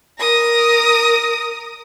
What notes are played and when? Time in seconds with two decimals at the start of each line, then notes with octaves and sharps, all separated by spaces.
0.19 A#4 D#6